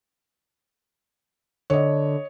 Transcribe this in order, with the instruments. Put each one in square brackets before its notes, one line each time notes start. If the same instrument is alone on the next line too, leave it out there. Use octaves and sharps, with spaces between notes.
[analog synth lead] D3 [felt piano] C#5 D#5